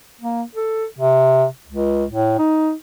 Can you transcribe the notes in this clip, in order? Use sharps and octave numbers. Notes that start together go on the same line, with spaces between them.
A#3
A4
C3
C#2
A2
D#4